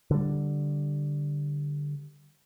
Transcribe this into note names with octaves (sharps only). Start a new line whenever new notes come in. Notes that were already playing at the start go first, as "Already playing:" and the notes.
D3 G3